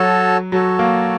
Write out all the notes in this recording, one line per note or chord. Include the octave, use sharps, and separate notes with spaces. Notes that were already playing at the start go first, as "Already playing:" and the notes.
Already playing: F#3 F#4 A4 C#5 A5
F#3 F#4 A4 C#5 A5
A#3